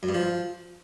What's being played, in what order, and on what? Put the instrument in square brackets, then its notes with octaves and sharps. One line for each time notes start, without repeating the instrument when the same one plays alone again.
[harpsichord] F#2
G2
F3